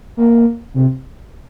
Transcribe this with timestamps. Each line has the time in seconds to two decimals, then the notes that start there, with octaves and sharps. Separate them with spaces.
0.17 A#3
0.74 C3